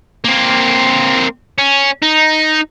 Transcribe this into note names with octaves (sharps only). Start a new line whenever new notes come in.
A#3 C4
C#4
D#4